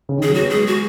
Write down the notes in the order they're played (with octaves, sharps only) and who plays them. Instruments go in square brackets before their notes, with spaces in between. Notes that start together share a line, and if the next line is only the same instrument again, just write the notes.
[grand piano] C#3
D#3
[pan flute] G#4
[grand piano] F#3
[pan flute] F#4
[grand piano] B3
[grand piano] G#3 [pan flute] G#4
[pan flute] F#4